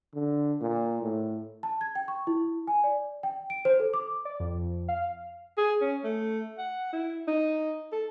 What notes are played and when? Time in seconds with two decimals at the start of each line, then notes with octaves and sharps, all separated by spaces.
0.14 D3
0.61 A#2
1.02 A2
1.63 A5
1.81 G#6
1.95 G5
2.08 C#6
2.27 E4
2.67 G#5
2.84 D5
3.23 G5
3.50 D7
3.65 C5
3.80 A4
3.94 D6
4.25 D5
4.40 F2
4.88 F5
5.58 G#4
5.81 C#4
6.04 A3
6.58 F#5
6.93 E4
7.28 D#4
7.92 A4